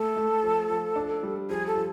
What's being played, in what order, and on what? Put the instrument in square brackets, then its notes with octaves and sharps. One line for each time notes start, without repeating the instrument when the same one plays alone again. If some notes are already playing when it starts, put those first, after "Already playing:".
Already playing: [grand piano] A3 [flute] A4
[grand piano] A3
F3
F3
D4
G3
[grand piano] F3 [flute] G#4
[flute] A4
[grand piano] F3